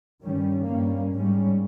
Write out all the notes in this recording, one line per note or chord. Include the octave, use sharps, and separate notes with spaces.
G2 D#3 G3 C#4
G2 G3 A#3 C#4
G#2 G3 C#4